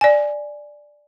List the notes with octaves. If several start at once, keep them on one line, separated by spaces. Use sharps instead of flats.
D5 G#5